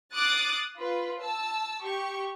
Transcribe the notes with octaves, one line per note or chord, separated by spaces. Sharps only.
D6 D#6 F#6 A6 C7 D7
F4 B4
A5 E6
G4 C#6